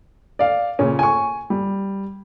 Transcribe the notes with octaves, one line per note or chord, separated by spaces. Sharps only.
D5 F5
A#2 C#3 C#4
G#5 C#6
G3